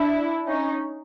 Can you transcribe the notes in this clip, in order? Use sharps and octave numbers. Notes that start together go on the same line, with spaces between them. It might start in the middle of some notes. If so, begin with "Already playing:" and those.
Already playing: D4 E4
C#4 D#4